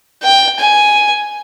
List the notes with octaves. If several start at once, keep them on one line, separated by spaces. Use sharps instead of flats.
G5
G#5